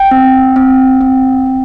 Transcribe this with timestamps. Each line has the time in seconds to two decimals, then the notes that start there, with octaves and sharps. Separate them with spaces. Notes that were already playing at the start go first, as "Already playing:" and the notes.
Already playing: G5
0.11 C4
0.56 C4
1.01 C4
1.46 C4